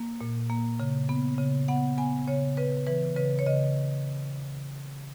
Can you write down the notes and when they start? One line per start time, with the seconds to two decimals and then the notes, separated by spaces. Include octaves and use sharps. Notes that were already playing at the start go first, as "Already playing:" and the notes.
Already playing: A#3
0.21 A#2
0.50 A#3
0.80 C#3
1.09 B3
1.38 C#3
1.68 B3 F#5
1.98 B3 G#5
2.28 C#3 C#5
2.57 C#3 B4
2.87 E3 B4
3.16 C#3 B4
3.39 C#5
3.46 C#3 D#5